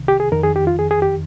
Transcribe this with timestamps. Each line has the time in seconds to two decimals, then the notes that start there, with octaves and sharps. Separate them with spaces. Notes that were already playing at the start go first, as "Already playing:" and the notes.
Already playing: C2 C3 D#3
0.08 G4
0.20 G#4
0.32 F2 D#3 A#4
0.43 G#4
0.56 G4
0.67 F4
0.79 G#4
0.91 G#4
1.02 G4